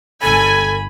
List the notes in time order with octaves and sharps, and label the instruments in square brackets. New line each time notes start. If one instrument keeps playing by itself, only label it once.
[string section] G1 G#5 [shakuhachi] A4 [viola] B5